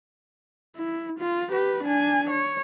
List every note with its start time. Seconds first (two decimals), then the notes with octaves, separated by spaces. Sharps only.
0.76 E4
1.19 F4
1.50 G4 B4
1.84 D4 G#5
2.30 C#5